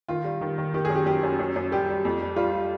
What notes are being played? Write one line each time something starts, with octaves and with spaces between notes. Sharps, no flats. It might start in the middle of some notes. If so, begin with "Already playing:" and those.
D#3 F4
G3
D#3
D#3
D#3 G4
F#2 G#4
G4
F#2 G4
F#2
F#2
F#2
G3 G4
G3
F2
G3
G3 F4